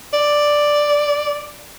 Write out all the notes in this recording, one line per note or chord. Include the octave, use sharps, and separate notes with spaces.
D5